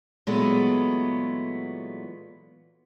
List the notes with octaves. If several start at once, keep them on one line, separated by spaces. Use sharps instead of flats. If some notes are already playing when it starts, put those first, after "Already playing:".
A#2 E3 F#3 G#3 A3 B3